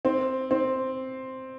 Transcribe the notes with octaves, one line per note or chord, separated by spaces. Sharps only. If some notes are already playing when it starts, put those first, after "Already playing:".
C4
C4